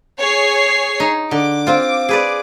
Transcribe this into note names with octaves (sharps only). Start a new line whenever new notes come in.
G#4 C#5 C7
D#4
D3 D6
C4 F4
G#4 B4 D5